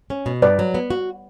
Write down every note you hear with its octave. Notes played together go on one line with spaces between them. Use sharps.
C#4
B2
G2 B4 D5
F#3
B3
F#4